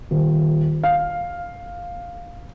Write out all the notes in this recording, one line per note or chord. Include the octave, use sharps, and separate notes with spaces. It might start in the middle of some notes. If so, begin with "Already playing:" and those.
D#1
F5